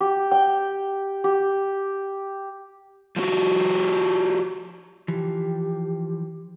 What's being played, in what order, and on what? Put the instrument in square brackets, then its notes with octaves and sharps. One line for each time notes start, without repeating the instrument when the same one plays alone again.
[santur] G4
G5
G4
[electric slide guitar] F3 G#3 C4 F#4 G4
[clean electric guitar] E3 F3 [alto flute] G4